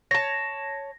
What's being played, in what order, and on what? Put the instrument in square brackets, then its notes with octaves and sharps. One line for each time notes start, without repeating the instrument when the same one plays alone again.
[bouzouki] C#5 A5 [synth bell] A#6